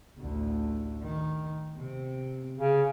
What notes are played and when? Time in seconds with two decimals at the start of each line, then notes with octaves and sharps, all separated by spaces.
0.18 A1 D2
1.03 D#3
1.77 C3 C4
2.58 C#3